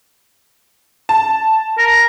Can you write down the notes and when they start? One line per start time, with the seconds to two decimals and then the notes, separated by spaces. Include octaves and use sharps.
1.09 A5
1.78 A#4